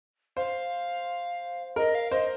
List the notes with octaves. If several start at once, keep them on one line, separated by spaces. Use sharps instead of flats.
C5 F5
A#4 D#5
F5
C5 D#5